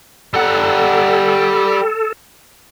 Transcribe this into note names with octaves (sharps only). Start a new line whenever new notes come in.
G3 A4 F#5